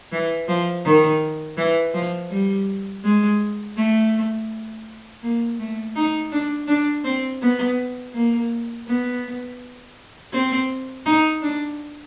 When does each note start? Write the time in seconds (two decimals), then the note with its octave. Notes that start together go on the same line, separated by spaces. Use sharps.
0.12 E3
0.48 F3
0.85 D#3
1.57 E3
1.94 F3
2.31 G3
3.04 G#3
3.77 A3
5.22 A#3
5.59 A3
5.96 D#4
6.32 D4
6.68 D4
7.04 C4
7.41 B3
8.14 A#3
8.87 B3
10.33 C4
11.05 D#4
11.42 D4